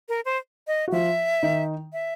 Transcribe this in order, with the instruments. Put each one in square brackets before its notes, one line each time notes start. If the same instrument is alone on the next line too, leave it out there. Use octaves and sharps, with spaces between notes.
[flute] A#4
C5
D#5
[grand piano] F#4
[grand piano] F3 F4 [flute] E5
[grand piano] D#3 D#4
[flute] E5